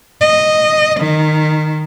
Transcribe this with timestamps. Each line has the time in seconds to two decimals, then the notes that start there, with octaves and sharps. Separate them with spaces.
0.21 D#5
1.01 D#3